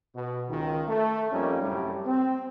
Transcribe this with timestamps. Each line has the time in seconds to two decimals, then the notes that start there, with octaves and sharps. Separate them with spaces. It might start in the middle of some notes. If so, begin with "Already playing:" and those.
0.15 B2
0.49 C#2 D#3
0.88 A3
1.32 F2 G3 A#3 C#4 D#4
1.61 F#2 A2 C3 G3 A3
2.06 C4